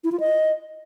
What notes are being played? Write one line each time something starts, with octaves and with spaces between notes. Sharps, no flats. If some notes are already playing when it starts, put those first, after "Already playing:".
E4
F4
D#5